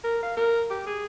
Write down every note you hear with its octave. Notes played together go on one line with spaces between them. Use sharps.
A#4
F5
A#4
G4
G#4